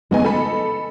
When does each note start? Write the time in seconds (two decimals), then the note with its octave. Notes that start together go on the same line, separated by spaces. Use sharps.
0.11 C#3 G#3 B3 D#4 G#5
0.25 A4 D#5 B5